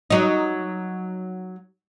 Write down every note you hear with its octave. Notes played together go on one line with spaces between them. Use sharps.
F#3 D#4